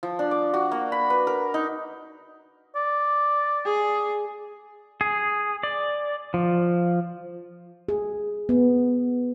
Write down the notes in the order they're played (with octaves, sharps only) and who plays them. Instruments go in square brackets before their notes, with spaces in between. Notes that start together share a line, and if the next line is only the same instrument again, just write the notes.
[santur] F3
D4
D6
F#4
A#3
B5
B4
A#4
D#4
[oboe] D5
[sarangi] G#4
[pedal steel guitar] G#4
D5
F3
[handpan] G#4
B3